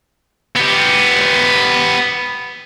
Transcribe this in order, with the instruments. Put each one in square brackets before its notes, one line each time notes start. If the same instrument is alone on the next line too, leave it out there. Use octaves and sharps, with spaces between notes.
[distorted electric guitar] B3 G4